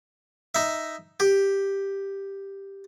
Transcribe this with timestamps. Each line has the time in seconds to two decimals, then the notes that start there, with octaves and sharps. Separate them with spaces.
0.55 D#4 E5
1.20 G4